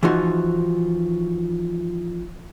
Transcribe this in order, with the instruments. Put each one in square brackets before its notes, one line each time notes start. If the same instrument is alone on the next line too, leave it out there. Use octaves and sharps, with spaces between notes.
[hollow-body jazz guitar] E3 F3 D#4 F#4